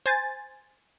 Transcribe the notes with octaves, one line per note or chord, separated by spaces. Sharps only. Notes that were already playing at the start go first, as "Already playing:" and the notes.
C5 G#5 A6